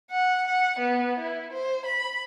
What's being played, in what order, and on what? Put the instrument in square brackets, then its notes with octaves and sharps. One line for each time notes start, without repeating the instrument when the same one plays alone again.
[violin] F#5
F#5
B3
E4
C5
B5